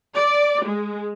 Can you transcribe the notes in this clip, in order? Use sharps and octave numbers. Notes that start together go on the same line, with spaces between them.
D5
G#3